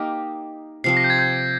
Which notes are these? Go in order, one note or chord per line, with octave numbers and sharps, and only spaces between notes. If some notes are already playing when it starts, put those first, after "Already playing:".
Already playing: A#3 D#4 G4 A#4
C3 F3 C4 C7
A#6
G6
G#6
G6
G#6